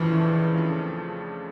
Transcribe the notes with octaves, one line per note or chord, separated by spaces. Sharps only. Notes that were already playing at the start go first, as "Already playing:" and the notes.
Already playing: F2 C#3 E3 F3 A3 D4
F2 C#3 F3 A3 D4